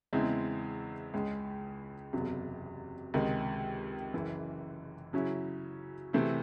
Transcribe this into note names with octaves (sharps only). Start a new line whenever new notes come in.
E2 C#3 G#3 C4 E4
C#2 C#3 G#3
F#1 E2 C3 F#3
C#2 C3 D#3 G#3
F#1 F#2 E3
C#3 F#3 C#4 E4
C3 E3 A3 C4 E4